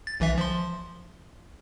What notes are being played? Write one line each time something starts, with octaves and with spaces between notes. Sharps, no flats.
A6
B1 E3 E5
F3 C6